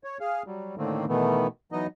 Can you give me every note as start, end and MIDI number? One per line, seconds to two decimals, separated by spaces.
0.04 0.18 73
0.20 0.43 68
0.20 0.43 77
0.46 0.75 54
0.46 0.75 55
0.78 1.05 45
0.78 1.05 50
0.78 1.05 51
0.78 1.05 57
0.78 1.05 58
0.78 1.05 60
1.08 1.47 47
1.08 1.47 51
1.08 1.47 52
1.08 1.47 57
1.08 1.47 59
1.72 1.87 52
1.72 1.87 54
1.72 1.87 59
1.72 1.87 63
1.72 1.87 75